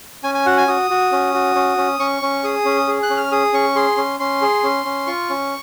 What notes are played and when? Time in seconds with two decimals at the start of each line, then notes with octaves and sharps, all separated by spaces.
0.23 C#4 G#5
0.34 G#5
0.46 F#4 F#5
0.57 G#5
0.68 F#4 D#6
0.90 F#4
1.12 C#4
1.34 F#4
1.55 C#4
1.77 C#4
1.99 C#4 C#6
2.22 C#4
2.44 G#4 D#6
2.65 C#4
2.88 G#4
3.03 F#6
3.10 C#4
3.17 F6
3.32 G#4 D#6
3.53 C#4 C#6
3.76 G#4 C6
3.97 C#4
4.20 C#4 C6
4.42 G#4
4.63 C#4
4.85 C#4
5.07 F4 C#6
5.30 C#4